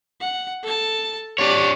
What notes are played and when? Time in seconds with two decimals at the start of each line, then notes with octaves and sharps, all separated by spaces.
0.20 F#5
0.63 A4 A5
1.38 D4 G4 C#5 D5